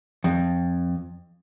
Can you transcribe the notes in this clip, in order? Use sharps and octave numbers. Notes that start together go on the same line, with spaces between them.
F2